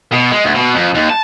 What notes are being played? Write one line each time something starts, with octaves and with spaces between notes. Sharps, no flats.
B2
G#3
D2
B2
F2
D#2
A5